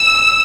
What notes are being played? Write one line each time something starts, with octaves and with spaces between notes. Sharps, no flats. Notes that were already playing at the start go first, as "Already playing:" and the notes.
Already playing: E6